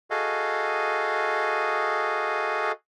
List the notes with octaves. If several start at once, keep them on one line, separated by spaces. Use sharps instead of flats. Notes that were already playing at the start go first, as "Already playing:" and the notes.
F#4 G#4 A4 D#5 F5